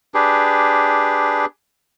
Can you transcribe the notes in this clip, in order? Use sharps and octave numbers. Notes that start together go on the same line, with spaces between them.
D4 G4 G#4 B4